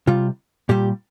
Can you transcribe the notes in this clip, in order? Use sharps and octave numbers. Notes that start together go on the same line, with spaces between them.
C3 G3 F4
A#2 G3 G4